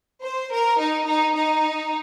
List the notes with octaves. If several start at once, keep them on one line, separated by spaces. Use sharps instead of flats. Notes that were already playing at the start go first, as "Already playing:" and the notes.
C5
A#4
D#4
D#4
D#4